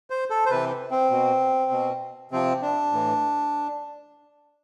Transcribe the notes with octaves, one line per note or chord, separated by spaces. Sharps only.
C5
A4
C5
C3 E3 B4
C4
B2
B2
C3 F3 C4
D4
A2 E3